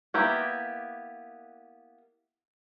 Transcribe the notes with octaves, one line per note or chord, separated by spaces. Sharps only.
A#3 B3 E4 G4 A#5